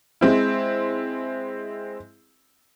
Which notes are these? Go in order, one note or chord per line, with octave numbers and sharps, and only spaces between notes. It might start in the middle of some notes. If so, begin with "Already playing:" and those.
G#3 C4 E4